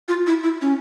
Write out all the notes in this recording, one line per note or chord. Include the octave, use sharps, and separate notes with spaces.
F4
E4
E4
C#4